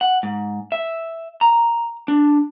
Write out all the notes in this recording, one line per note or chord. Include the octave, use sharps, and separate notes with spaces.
F#5
G#2
E5
A#5
D4